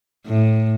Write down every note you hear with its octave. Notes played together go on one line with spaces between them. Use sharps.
A2